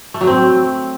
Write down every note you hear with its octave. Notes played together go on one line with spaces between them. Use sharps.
A3
F#3
C4